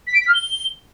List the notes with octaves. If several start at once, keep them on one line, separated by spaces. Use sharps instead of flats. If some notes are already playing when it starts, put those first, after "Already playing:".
B6
D7
B6
F6
G7